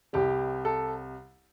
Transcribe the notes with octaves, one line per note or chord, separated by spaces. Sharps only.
C2 C3 G3 G4
A4